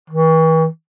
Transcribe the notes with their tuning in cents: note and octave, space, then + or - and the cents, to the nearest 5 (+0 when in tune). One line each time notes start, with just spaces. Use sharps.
E3 -40